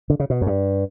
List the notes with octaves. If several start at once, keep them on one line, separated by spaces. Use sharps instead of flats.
D3
C#3
B2
F#2
G2